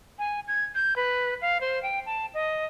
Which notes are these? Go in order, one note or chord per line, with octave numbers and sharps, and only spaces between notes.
G#5
G#6
G6
B4
F5
C5
G5
A5
D#5